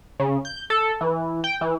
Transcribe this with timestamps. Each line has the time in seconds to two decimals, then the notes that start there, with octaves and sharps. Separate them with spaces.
0.20 C#3
0.45 G6
0.70 A4
1.01 E3
1.44 G5
1.61 E3